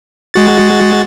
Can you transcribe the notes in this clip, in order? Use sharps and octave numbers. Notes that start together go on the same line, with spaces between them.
G#3 F#4 A6